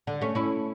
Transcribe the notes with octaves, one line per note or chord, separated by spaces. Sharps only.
D3
A3 C#4
C#4 E4